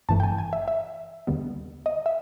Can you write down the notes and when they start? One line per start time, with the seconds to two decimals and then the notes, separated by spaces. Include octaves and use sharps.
0.09 G1 G2 E3 A3 A5
0.20 G5
0.23 G#5
0.38 G#5
0.53 E5
0.68 E5
1.27 D#2 D3 G3 B3
1.86 D#5
2.06 E5